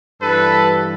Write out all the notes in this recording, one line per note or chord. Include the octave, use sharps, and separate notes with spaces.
G2 E3 G3 A4 B4